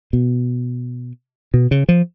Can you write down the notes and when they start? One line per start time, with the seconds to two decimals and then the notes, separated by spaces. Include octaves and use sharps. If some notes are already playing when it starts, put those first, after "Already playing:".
0.13 B2
1.54 B2
1.71 C#3
1.89 F3